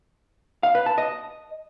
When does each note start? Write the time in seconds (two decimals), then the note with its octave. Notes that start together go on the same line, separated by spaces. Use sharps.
0.63 F5
0.75 B4
0.86 A5
0.98 D#5